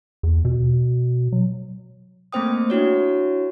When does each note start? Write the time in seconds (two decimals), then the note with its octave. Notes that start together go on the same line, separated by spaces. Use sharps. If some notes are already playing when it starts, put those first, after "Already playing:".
0.23 E2
0.45 B2
1.32 F#3
2.33 A3 A#3 C4 C5 G5 D#6
2.70 D4 E4 F#4 C#5